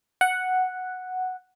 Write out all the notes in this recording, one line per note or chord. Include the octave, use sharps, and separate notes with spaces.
F#5